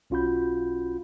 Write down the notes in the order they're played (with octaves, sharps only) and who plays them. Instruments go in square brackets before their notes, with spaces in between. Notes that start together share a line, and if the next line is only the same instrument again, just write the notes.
[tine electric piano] B1 C#4 F4 F#4 B5 G6